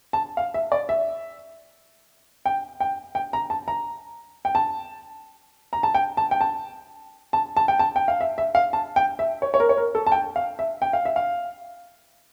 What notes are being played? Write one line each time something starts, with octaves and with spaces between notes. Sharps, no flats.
A5
F5
E5
D5
E5
G5
G5
G5
A#5
A5
A#5
G5
A5
A#5
A5
G5
A5
G5
A5
A5
A5
G5
A5
G5
F5
E5
E5
F5
A5
G5
E5
C#5
C#5
A#4
C#5
A#4
A4
A5
G5
F5
E5
G5
F5
E5
F5